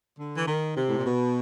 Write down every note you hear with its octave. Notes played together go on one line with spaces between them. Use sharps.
D3
E3
D#3
C3
A2
A#2
B2